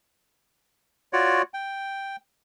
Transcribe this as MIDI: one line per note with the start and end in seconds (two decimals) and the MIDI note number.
1.13 1.42 65
1.13 1.42 66
1.13 1.42 73
1.13 1.42 74
1.54 2.16 79